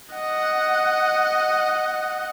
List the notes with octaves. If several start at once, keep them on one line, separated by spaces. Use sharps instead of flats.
D#5 F#5